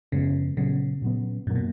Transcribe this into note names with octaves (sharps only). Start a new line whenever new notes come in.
F#2 C#3 F3 G#3 B3
A#2 C#3 F#3 B3
A#2 F#3 B3
F#2 A#2 D#3 F#3 A#3
B2